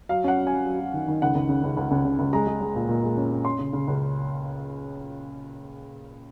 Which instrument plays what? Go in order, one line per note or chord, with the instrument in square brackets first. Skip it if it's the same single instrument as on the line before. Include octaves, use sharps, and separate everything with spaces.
[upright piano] F#3 F5
C#4 F#5
F#3
C#4 G#5
F#3
F#3
D#3
D#3
C#2 F#5
C#2
C#3
C#2
C#2
C#2
C#3
C#2
G#3 A#5
G#3
G#3
A#2
A#2
G#3
C#4
C#4
C#4 C6
C#3
C#3
C#2